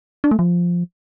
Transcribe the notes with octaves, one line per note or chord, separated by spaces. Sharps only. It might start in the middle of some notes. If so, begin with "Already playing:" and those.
D4
A3
F3